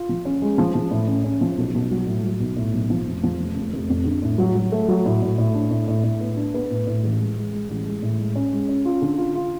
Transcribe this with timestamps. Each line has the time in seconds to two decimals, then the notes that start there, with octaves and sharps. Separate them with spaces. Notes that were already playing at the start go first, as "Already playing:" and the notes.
Already playing: F4
0.09 F3
0.25 C#4
0.42 G#3
0.58 F3
0.75 F3
0.91 A2
1.07 C#4
1.24 C#4
1.41 F3
1.57 B1
1.74 B1
1.91 F#3
2.07 A2
2.23 F#3
2.40 B1
2.56 A2
2.73 B1
2.90 F3
3.06 F1
3.23 F3
3.40 F1
3.56 F1
3.73 F1
3.89 F2
4.05 D3
4.22 A2
4.38 F#3
4.55 F#3
4.72 A3
4.88 F#3
5.05 A2
5.22 A2
5.38 A2
5.55 D4
5.70 A2
5.88 A2
6.04 A2
6.21 B3
6.37 D4
6.54 B3
6.70 A2
6.87 A2
7.04 A1
7.19 G#3
7.36 G#3
7.53 G#3
7.69 A1
7.86 G#3
8.02 A2
8.19 G#3
8.35 C#4
8.52 G#3
8.69 C#4
8.85 F4
9.02 D3
9.18 F4
9.35 F4